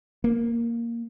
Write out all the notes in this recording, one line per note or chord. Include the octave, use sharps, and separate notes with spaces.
A#3